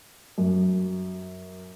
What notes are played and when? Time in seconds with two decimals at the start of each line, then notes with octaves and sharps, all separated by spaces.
0.38 F#2